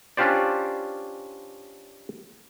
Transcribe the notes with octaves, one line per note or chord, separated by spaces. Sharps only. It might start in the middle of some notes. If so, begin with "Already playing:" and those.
C#4 D4 F4 G4 C5 D5